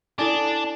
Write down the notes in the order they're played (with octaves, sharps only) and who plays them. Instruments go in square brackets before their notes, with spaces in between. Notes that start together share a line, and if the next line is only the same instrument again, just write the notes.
[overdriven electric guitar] D4 [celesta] E4 A4 D5 G#5